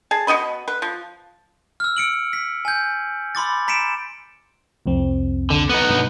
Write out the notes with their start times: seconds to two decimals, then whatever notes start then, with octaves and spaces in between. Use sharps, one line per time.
0.11 G#4 A5
0.27 B2 E4 D#5 B5
0.68 B4
0.82 F3
1.80 E6 F6
1.97 E6 C#7 D7 F#7
2.33 B6
2.65 G#5 G6
3.35 B5 C6 D6 A6
3.68 A#5 B6 C#7 D7 E7
4.86 C2 F2 C4
5.50 D3
5.69 B3 D#4
5.90 G2 B2